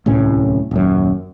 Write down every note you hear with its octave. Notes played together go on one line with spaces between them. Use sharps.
D1 C2 A2 C#4
D#1 F#2